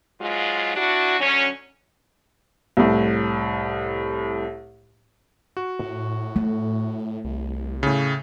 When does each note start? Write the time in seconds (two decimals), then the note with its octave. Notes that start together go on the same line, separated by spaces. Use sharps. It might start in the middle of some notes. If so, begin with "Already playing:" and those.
0.20 G#2 F#3 G#3 F4
0.75 D4 E4 F#4
1.19 D2 F#3 C#4
2.77 C2 A2
5.57 F#4
5.79 A2
6.36 A3
7.25 C2
7.83 A2 C#3